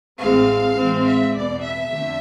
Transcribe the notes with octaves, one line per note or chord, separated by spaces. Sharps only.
A1 A2 G#3 C4 F5
A2 E3 G#3 C4
E5
E2 B2 B3 D5
E5
F2 D3 A3